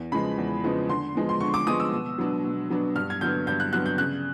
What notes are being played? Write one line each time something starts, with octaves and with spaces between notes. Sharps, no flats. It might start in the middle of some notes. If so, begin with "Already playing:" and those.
Already playing: E2
C#3 F3 G#3 B3 B5
E2
C#3 F3 G#3 B3
D3 C6
F3 G#3 B3
C6
D3 C#6
D6
F3 G#3 B3 D#6
E6
B2
F#3 B3 D4
B2
F#3 B3 D4
G2 F6
G#6
D3 F#3 B3 G6
G2 G6
F#6
D3 F#3 B3 F#6
G6
C#3 F#6